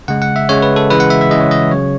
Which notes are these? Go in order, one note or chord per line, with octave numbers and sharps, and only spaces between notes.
C#3 G#3 F#5
F#5
E5
C#3 G#3 C#5
B4
A4
C#3 E3 G#3 B4
F#5
E5
E5
C#3 E3 G#3 D#5
C#5
D#5
C#3 F#3 C#5